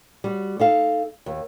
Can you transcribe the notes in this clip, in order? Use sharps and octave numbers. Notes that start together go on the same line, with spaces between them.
G3 F#4
D#4 A4 F5
D#2